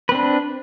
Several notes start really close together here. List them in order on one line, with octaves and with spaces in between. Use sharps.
B4 C4 D4